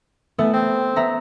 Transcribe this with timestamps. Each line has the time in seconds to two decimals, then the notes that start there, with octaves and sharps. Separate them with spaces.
0.38 E3 A3 B3
0.53 C4
0.96 B3 E5 A#5